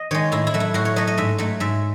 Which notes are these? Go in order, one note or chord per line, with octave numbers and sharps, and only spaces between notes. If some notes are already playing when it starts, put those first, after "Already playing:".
Already playing: D#5
D#3 G#3 C#5
A2 E4
E4
F#3 A3
E4
A2 F#4
C#5
F#3 A3 D#5
D#5
G#2 E5
F#3 A3
G#2 E5